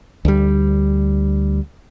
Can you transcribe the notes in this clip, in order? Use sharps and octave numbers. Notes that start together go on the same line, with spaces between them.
D2 G3